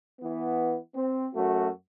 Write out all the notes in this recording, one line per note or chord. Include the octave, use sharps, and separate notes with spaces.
E3 B3
C4
F#2 A3 F#4